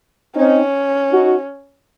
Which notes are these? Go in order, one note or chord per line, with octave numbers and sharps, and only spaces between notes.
C4 C#4 D#4
D#4 F#4